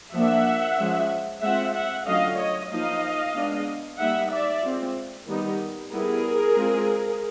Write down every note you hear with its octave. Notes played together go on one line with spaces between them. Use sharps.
F3 A#3 D4 E5 F#5
F3 G#3 C#4
G#3 C4 F4 E5 F#5
E5 F#5
D3 F#3 A3 C#4 F4 D#5 F5
C#5 D#5
F3 A#3 D#4 D#5 F5
G#3 B3 D4
G3 A#3 D#4 E5 F#5
D5 E5
G#3 C4 F4
D#3 G3 B3 D#4
G3 B3 E4 G#4 A#4
G#3 C4 F4